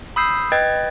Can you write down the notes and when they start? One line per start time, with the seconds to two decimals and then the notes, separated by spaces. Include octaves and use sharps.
0.16 B5 D#6 E6 G6 C7
0.52 B4 D#5 G5 G#6 A6